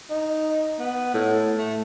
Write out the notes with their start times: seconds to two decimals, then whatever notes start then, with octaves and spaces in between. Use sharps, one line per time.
0.10 D#4
0.79 B3
1.14 A2
1.58 A3